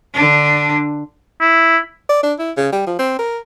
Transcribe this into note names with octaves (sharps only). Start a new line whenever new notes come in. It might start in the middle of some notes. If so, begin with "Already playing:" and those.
D3 D4
E4
D5
D4
E4
C#3
G3
F3
C4
A#4